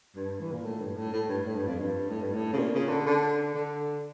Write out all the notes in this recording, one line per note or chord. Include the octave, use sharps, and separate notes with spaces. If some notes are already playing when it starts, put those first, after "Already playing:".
G2
E3
A#2
A2
G2
A2
A2
G2
A2
G2
F2
G2
A2
G2
A2
C#3
A#2
C#3
D3
D3
D3